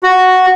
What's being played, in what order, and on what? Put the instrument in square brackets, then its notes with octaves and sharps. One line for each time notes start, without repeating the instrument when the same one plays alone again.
[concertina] F#4